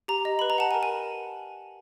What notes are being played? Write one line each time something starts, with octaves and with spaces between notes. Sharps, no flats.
G4 A#5
D#5
B4 B5
A#5
F#5 A5
G#5
A#4
G#5